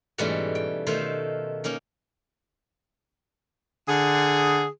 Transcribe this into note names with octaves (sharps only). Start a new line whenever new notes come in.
G#2 B2 E3 G3 A3 C#4
G5
B2 D#3 A3 C5 F5
A#3 C#4 D#4
D3 G#4